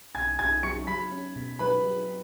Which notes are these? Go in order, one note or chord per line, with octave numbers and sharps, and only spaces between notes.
B1 G#5 G#6
B1 G#5 G#6
F#3 C#6 C#7
F#3 B5 B6
C#4
B2
F#3 B4 B5
F#3